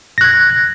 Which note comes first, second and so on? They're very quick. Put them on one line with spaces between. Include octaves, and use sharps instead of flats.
A#6 F#6 G#6